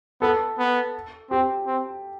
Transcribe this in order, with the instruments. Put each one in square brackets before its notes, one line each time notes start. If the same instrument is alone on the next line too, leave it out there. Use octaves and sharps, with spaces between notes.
[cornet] B3 [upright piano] A4
[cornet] B3
[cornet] C4 [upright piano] G4
[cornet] C4